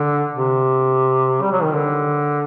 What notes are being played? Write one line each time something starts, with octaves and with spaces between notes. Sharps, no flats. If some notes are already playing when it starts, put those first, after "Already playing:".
Already playing: D3
C3
G3
F#3
D#3
D3